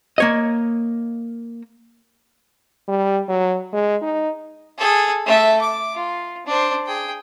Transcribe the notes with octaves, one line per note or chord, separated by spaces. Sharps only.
A#3 C#5 D#5
G3
F#3
G#3
D#4
G#4 A4
A3 E5
D6
F4
D4 C5
G#4 G5